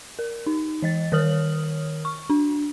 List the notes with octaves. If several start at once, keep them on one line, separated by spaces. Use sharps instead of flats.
A#4
D#4
E3 D#5 A6
D#3 A#4 C#5 D#6 F6 F#7
C#6
D4